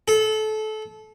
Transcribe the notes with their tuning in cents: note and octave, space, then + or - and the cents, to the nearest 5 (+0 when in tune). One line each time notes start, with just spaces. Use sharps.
A4 -25